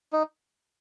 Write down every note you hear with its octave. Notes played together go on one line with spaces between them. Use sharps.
D#4